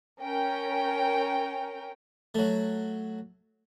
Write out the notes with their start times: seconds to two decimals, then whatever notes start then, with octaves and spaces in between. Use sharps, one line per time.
0.20 C#4 A#4 G5
2.35 F#3 A3